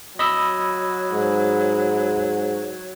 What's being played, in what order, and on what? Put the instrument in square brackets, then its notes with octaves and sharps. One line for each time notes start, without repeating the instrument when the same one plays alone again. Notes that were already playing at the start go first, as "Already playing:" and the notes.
[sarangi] F#3 [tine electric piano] D#5 B5 E6
[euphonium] G#2